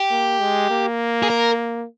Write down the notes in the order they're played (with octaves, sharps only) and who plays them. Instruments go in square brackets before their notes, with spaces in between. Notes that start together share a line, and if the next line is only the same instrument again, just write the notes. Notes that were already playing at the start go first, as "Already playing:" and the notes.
Already playing: [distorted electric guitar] G4
[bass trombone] A#3
G#3
A#3
[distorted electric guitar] G#4
A#4